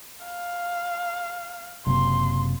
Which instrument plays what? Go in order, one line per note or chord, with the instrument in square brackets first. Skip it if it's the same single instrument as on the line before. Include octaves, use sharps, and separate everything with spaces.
[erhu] F5
[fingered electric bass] F#1 C3 A#3 [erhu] C6